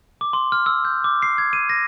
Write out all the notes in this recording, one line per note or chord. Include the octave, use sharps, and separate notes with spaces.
D6
C6
F6
E6
G6
D6
C7
G#6
D#7
A#6